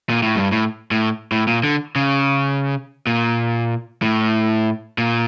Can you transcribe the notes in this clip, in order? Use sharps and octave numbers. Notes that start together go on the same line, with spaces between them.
A#2
A2
G2
A2
A2
A2
A#2
D3
C#3
A#2
A2
A#2